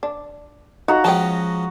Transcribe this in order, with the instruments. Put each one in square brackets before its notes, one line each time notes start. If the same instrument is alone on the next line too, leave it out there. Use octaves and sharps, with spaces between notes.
[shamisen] D4
[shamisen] D#4 F4 [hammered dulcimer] F#4 A#5
[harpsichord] F3 G#3 C#4 [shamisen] G5 A5